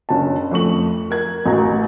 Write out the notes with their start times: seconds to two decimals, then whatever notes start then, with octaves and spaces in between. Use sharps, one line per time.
0.09 F#1 C#4 D4 A5
0.51 F2 A3 C#6 F#7
1.11 A#4 G#6
1.46 A1 A2 F#4 A#5